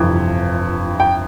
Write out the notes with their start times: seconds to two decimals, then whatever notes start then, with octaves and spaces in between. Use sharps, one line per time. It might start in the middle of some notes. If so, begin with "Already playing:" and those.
Already playing: G1 F2 C3 E3
1.00 G5